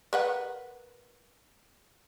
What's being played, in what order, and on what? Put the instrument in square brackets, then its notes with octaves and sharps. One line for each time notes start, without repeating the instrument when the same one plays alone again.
[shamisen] A#4 B4 F#5